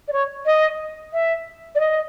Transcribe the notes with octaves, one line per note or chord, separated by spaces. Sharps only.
D5
C#5
D#5
E5
D5
D#5